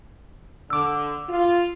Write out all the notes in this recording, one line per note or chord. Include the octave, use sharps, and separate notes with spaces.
D3 D6 E6
F4